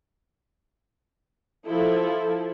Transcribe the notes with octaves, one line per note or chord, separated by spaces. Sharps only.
F3 E4 A4